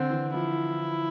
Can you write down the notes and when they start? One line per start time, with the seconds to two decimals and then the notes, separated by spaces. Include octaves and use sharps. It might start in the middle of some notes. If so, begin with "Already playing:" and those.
Already playing: D3 C4
0.10 E3
0.34 F3 E4